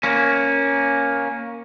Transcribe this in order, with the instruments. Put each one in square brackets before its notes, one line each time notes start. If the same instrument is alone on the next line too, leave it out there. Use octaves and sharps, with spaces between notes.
[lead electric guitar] A#3 C#4